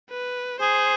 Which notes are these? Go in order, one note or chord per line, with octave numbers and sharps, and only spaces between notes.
B4
G#4 C5